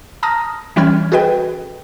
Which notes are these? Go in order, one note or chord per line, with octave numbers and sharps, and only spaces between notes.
A5 A#5 D#6 F6 A#6
E3 G3 C#4 B5 F6 G#6
F#4 G#4 A4 B4 D#5 G5